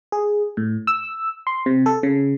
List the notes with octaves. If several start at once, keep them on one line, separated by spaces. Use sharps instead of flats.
G#4
A2
E6
C6
C3
A4
C#3